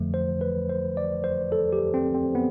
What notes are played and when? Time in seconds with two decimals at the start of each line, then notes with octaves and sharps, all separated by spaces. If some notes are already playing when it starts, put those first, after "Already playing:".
Already playing: F2 D3 F3 A3
0.14 C5
0.41 B4
0.69 C5
0.97 D5
1.24 C5
1.52 A4
1.72 G4
1.94 C4
2.14 C4
2.35 B3